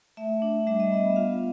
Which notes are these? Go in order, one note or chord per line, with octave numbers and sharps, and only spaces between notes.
A3 E5
D4
G3 E5
D#5
B3 E5
F4 F5